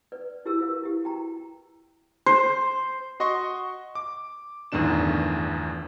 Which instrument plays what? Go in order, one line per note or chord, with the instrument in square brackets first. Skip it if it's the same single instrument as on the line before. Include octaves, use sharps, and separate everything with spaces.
[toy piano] B4 D5
E4 F#4 G4 A#4 E6
F4 B4 F5
E4 G4
F#4 G5 A#5
[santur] C5
[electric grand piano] F#4 D#5 C6 C#6
D6
G1 E2 A2 D#3 D4 E7